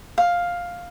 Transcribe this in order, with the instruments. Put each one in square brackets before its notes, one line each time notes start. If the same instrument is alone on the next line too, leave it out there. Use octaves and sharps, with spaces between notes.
[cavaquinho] F5